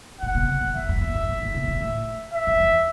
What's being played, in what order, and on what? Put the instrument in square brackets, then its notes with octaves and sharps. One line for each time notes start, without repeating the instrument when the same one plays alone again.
[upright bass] A2 [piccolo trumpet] F#5
[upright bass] B2
C#3
B2
[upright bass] F#2 [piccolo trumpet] E5
[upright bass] F#2
E2
F#2
A2
A2
B2
B2
A2
[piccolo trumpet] E5
[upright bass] F#2
E2